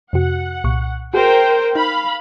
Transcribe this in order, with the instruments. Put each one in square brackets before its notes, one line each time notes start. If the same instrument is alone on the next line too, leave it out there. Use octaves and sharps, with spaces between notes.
[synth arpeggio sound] F2 C3 F#4 [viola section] F#5
[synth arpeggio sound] C2 A#2 C#6
[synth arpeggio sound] F#4 G#4 [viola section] A#4 C5 G5
[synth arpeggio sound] D#4 [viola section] F5 B5